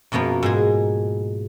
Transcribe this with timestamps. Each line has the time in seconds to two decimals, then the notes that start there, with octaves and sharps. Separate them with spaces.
0.12 F#2 B2 F3 A#3 B3
0.43 G#2 G#3 G#4